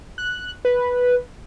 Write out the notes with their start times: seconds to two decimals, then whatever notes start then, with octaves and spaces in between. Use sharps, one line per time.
0.18 F#6
0.65 B4